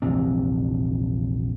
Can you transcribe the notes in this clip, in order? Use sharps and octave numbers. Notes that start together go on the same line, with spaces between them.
A#1 E2 C3 C4